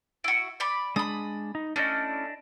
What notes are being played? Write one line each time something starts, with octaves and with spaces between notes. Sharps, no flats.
E4 F#4
D5 B5
G#3 D4 B5 D#6
D#4
A3 C#4 D4 E4 D5 D#5